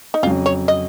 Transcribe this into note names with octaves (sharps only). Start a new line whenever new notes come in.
D#4
F2 C#3 F#3 F4
C#5
D#5